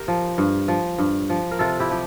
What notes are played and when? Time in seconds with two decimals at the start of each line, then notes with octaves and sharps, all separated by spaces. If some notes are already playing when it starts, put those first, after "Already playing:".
Already playing: G4 A#4
0.08 F3
0.38 G2
0.68 F3
0.98 G2
1.30 F3
1.51 A#4
1.59 C3 F4 A4
1.80 E4 G4
1.90 F3 G4